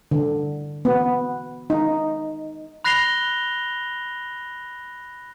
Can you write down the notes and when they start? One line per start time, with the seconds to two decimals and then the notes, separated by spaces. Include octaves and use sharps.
0.11 D3
0.85 B3
1.70 D#4
2.84 B5 F#6 A#6 C7 F7 G7